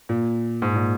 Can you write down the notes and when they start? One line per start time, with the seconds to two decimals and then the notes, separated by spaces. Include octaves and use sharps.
0.09 A#2
0.62 G#2
0.75 A#2